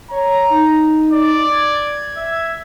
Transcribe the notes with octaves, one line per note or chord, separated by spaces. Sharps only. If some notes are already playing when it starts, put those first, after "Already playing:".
C#5 A#5
D#4
D5
G#6
E5